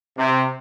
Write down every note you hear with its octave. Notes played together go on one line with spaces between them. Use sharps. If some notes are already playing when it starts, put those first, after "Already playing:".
C3